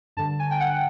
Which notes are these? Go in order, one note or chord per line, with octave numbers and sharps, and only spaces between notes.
G2 D3 A5
G#5
G5
F#5